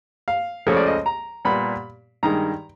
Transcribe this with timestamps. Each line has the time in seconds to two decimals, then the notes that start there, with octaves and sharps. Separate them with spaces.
0.28 F5
0.67 C#2 C#3 F3 A3 C#5
0.77 D5
0.86 D#5
1.06 A#5
1.45 A#2 G3 B3 B5
2.23 G2 D#3 G#3 A#5